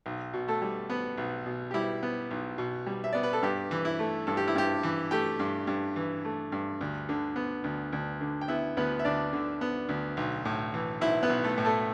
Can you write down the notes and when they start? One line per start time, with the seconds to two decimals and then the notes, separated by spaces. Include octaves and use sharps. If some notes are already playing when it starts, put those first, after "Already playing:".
0.06 B1
0.33 B2
0.48 A3 A4
0.62 G3
0.90 B3 B4
1.18 B1
1.46 B2
1.71 G4
1.74 G3 E4
2.03 B3
2.31 B1
2.58 B2
2.87 G3
3.04 E5
3.13 B3 D5
3.23 B4
3.33 A4
3.42 G2 G4
3.71 E3
3.85 E4
3.99 A3
4.27 G2 A4
4.37 G4
4.48 E4
4.55 G2 G4
4.83 E3
5.11 A3 G4 G5
5.39 G2
5.67 G2
5.96 E3
6.25 A3
6.52 G2
6.81 D2
7.09 D3
7.36 B3
7.64 D2
7.93 D2
8.21 D3
8.41 G5
8.48 B3 E4 E5
8.77 D2 B3 B4
8.99 E5
9.05 D2 D4 D5
9.33 D3
9.61 B3
9.89 D2
10.17 B1
10.45 A2
10.74 E3
11.01 B1 E4 E5
11.23 B3 B4
11.30 B1
11.44 A3 A4
11.58 A2
11.65 A3 A4